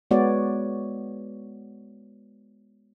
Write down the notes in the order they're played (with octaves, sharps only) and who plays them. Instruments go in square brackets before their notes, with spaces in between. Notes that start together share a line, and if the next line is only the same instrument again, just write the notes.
[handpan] G#3 B3 F#4 C#5 D5